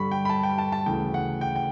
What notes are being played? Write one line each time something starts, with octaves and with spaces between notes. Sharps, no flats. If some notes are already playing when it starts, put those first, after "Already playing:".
Already playing: G2 D3 G3 B5 C#6
G5
B5
A5
G5
A5
A5
D2 C#3 E3 G5
F#5
G5
G5